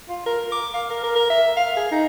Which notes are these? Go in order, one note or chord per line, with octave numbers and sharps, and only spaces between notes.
F4
A#4
D6
F5
A#4
A#4
A#4
E5
F5
G#4
D#4